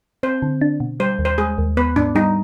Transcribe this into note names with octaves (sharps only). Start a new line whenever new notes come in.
C4 C5
D3
D4
B2
G3 C5
D#2
C5
G#3 G#4
D#2
B3 B4
G#2 D4
G3 D#4